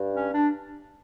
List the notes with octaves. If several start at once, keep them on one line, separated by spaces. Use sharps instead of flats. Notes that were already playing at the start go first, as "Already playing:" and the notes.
Already playing: G2
C#4
D4